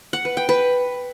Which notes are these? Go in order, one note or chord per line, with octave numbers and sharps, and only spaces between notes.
F#5
B4
G5
B4